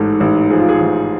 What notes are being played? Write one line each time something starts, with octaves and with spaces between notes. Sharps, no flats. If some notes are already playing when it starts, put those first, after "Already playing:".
Already playing: A1 G#2 A4
A1
F3 G#4
F4
G#4
A1